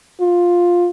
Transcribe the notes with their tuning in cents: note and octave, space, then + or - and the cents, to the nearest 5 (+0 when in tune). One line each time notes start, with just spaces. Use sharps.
F4 +10